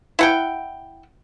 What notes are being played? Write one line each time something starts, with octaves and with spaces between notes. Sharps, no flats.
E4 F#5 G5